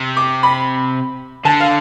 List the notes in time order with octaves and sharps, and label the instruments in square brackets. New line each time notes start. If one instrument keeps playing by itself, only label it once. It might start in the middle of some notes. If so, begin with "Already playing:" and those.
Already playing: [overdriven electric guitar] C3
[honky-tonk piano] D6
B5
[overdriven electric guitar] D3 [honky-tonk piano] A5
[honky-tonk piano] F5